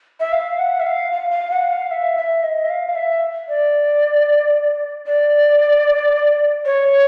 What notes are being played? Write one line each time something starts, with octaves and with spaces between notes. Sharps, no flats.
E5
F5
F#5
E5
F5
F5
F5
F#5
F5
E5
E5
D#5
E5
F5
F5
E5
D5
D5
C#5